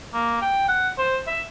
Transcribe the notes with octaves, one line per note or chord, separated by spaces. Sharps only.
A#3
G5
F#5
C5
E5